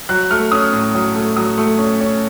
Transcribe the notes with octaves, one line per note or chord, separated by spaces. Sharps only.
F#3 F#6
A3 F6
C#4 D#6
A2
F#3
A3
F#3 D#6
A3
C#4
C#4